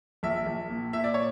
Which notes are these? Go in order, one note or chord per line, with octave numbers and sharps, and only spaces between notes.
A#1 E5
A#1
A#2
A#2 E5
D5
C#5